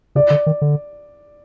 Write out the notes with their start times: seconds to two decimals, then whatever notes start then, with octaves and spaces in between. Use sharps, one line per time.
0.15 C#3 D5
0.30 D3
0.46 D#3
0.62 D3